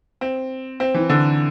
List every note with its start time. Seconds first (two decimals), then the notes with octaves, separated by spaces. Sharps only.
0.21 C4
0.80 C4
0.94 E3
1.09 D3